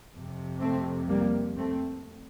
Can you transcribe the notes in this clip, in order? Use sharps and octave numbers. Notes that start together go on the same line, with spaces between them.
F2 C3
A3 C4
G3 A#3
A3 C4